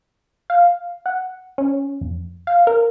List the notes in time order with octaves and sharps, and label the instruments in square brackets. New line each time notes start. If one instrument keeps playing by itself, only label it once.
[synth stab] F5
F#5
C#4
F2
F5
A#4